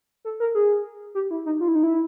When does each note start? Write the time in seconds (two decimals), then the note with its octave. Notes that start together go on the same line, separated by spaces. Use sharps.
0.25 A4
0.40 A#4
0.55 G#4
1.15 G4
1.31 E4
1.46 D#4
1.61 F4
1.68 E4
1.75 D#4
1.83 E4